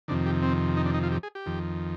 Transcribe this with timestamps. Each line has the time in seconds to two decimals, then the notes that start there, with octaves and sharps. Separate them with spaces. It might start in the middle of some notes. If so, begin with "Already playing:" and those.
0.08 F2 C3 D#3 D4
0.26 G4
0.43 C4
0.77 D#4
0.86 D4
0.94 D#4
1.03 F4
1.12 G4
1.23 G#4
1.35 G4
1.46 F2 D#3